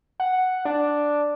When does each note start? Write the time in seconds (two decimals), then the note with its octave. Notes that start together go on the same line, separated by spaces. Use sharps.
0.20 F#5
0.65 D4